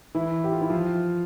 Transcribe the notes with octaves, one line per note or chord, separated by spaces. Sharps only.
E3 E4
G4
F4
E4
F3 F4